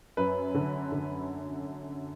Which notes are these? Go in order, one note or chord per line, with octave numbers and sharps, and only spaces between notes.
F#2 B4
D3
D3